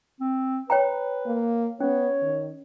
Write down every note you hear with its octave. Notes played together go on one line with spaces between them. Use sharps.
C4
B4 C#5 G5 A#5
A#3
B3 C#4 C#5
D#3